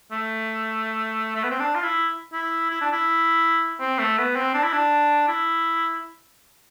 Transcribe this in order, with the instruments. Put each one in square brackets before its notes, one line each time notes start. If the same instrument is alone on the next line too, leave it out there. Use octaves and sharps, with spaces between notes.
[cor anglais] A3
A3
B3
C4
D4
F4
E4
E4
E4
D4
E4
C4
A3
B3
C4
D4
E4
D4
E4